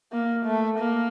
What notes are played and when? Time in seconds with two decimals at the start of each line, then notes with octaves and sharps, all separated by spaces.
0.12 A#3
0.45 A3
0.79 A#3